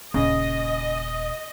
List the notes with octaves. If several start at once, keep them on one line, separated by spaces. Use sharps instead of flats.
D#1 C#3 D#5